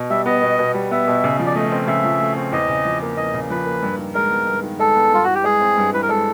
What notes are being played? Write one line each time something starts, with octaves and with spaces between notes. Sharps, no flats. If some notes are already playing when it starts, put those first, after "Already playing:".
Already playing: B2
G3 E5
B3 D#5
B2
B2
G3
B3 E5
B2
C#3
F3
D5
A3 D#5
C4
C#3 E5
F3
A3
C4
E2 D#5
C#3
F3
A#3
E2 D#5
C#3
F3 B4
A#3
G2
D#3
G#3 A#4
B3
G2
D#3
G#3 A4
B3
G2 F4
E3 F#4
G4
G#3 G#4
C4
G2
E3 B4
A#4
G#3 A4